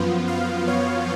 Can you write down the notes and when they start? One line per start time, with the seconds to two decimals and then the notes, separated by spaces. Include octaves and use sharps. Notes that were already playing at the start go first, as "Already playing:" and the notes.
Already playing: F#2 F3 B3 F4
0.28 F5
0.67 C#5